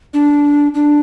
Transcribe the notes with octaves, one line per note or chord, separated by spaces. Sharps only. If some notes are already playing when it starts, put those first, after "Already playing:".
D4
D4